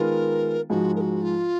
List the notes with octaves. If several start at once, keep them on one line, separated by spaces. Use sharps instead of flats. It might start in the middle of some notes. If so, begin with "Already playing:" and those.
Already playing: D#3 G#3 B3 F4 A#4
G#2 F3 G#3 F#4
A#4
F#4
F4